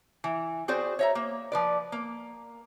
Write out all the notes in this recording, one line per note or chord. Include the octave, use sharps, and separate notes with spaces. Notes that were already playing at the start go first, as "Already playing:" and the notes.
E3
C4 F#4 G#4 C5 D5
C#5 E5 A#5
A#3
F3 B4 D5
A#3